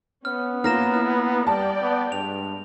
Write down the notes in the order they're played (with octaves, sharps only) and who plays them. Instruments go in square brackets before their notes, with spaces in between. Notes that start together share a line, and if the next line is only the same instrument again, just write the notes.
[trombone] B3 [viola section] C#4 [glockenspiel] F6
[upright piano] A#3 [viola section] C#4 F4 [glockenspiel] F6 A#6 E7
[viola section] E4 [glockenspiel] F6
[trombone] G3 [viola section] D5 G5 [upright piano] A5
[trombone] B3
[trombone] G2 [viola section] G#3 [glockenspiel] F7